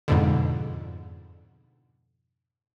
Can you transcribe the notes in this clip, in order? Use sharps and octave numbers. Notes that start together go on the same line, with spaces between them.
F2 G#2 B2 D3